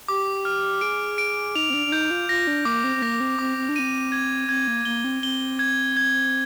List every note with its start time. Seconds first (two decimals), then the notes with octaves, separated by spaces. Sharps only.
0.08 G4 D6
0.45 F6
0.81 G#4 D7
1.18 D7
1.55 D#4 F7
1.70 C4
1.74 D4
1.86 D4
1.92 D#4 G6
2.11 F4
2.29 F4 A#6
2.47 D4
2.65 A#3 D6
2.84 C4
2.96 C4
3.02 A#3 A#6
3.20 C4
3.39 C4 D6
3.57 C4
3.69 D4
3.76 C4 D#7
4.12 G#6
4.49 C4 G#6
4.68 A#3
4.85 A#3 G7
5.04 C4
5.22 C4 G7
5.59 G#6
5.97 G#6